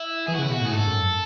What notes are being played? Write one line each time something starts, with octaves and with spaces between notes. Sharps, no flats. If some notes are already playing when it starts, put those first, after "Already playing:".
Already playing: E4
E3 G#4
F#4
C#3 E4
B2 F#4
A2 G#4
G#2 A4
F#2